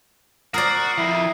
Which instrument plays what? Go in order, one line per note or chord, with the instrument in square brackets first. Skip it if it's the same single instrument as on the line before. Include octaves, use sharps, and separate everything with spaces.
[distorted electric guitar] F#4 [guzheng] A#4 D5 [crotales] D#6 C7
[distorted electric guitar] F2 [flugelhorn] E4